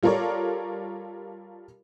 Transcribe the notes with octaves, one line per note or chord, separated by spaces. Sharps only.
G3 F4 A4 A#4 C#5 D5